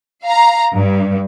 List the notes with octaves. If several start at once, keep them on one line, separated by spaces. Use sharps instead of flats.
F5 A#5
G2